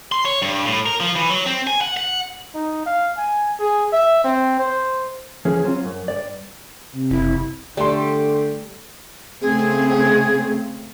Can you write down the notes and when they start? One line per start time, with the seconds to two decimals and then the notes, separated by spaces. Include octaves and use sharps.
0.12 C6
0.25 C#5
0.42 G2
0.66 A2
0.86 A#4
1.00 F3
1.16 E3
1.30 F#3
1.46 C4
1.67 G#5
1.81 F#5
1.97 F#5
2.54 D#4
2.86 F5
3.17 G#5
3.59 G#4
3.93 E5
4.24 C4
4.59 C5
5.45 E2 F3 C#4 G#4
5.64 F#3 C4 C#4 F4
5.85 F#2
6.08 G2 D5
6.93 C3
7.11 F#1 E4
7.77 D3 G3 A3 G4 D5 C6
9.42 C#3 A3 C4 G#4